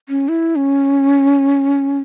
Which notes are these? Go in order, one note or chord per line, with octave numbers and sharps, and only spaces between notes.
C#4
E4
C#4